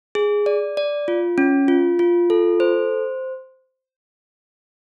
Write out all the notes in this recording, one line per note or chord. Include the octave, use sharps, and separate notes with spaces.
G#4
D5
D5
F4
C#4
F4
F4
A4
C5